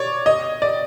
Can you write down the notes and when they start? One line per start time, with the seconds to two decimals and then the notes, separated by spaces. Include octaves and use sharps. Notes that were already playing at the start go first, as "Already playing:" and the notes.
Already playing: C#5 D5
0.26 D#5
0.62 D5